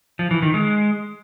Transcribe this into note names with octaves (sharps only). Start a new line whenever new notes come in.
F3
E3
D#3
G#3